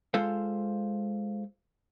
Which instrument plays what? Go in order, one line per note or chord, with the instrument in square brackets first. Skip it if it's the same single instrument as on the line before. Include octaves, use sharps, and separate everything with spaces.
[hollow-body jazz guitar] G#3 F4 A4 C5 F5